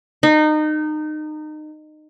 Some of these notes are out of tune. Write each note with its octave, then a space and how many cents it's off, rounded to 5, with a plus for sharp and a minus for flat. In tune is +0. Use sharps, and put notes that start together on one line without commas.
D#4 -25